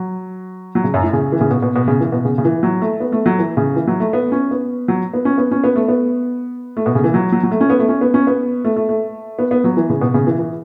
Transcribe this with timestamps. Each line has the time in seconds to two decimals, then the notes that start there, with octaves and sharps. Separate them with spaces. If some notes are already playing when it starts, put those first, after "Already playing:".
Already playing: F#3
0.75 F#3
0.84 C#3
0.94 F#2
1.03 A2
1.13 C#3
1.32 E3
1.41 C#3
1.51 B2
1.63 B2
1.76 B2
1.88 C#3
2.00 E3
2.12 B2
2.25 C#3
2.38 C#3
2.45 E3
2.63 F#3
2.82 A3
3.00 B3
3.12 A3
3.26 F#3
3.38 E3
3.57 C#3
3.76 E3
3.87 F#3
4.00 A3
4.13 B3
4.32 C#4
4.51 B3
4.88 F#3
5.14 B3
5.25 C#4
5.38 B3
5.51 C#4
5.64 B3
5.76 A3
5.88 B3
6.77 A3
6.86 B2
6.95 C#3
7.04 E3
7.14 F#3
7.32 F#3
7.43 F#3
7.51 A3
7.61 C#4
7.70 B3
7.79 A3
7.89 C#4
8.01 B3
8.14 C#4
8.27 B3
8.64 A3
8.76 A3
8.89 A3
9.39 B3
9.51 B3
9.64 F#3
9.77 E3
9.89 C#3
10.01 B2
10.14 C#3
10.27 E3
10.39 E3